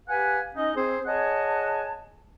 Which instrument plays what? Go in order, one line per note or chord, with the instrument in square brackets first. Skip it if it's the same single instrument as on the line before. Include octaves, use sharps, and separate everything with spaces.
[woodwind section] G4 B4 F5 F#5 G#5
C#4 D#4 D#5
C4 G#4 C5
G#4 C#5 D#5 F#5 G#5 A5